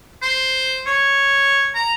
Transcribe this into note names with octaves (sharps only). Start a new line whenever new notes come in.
C5
C#5
A#5